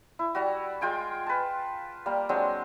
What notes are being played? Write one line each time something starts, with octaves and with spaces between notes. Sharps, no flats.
E4
G3 F#4
G#3 F4 G5 G#5
B4 A5
G3 A#3
F#3 G#3 C4 D4